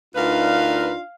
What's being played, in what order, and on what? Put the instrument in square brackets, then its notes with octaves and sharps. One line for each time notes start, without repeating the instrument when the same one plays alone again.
[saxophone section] D2 A#4 B4 [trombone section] D4 D#4 [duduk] F4 [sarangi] F5